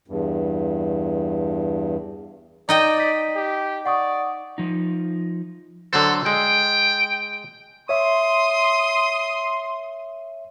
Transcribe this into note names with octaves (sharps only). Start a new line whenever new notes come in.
E2 G2
D#4 D5 D#5 G5
D#6 B6
G4
D5 F#5 C#6 D#6
F3 D#4
D3 F#3 A4 C5
G#3 G5
C#5 E5 C6 D#6